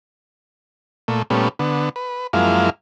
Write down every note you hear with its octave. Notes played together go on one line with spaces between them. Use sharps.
A#2 A3
A#2 G3 A3 B3 C#4
D3 B3
B4
F#2 F3 G#3 A#3 E4 F5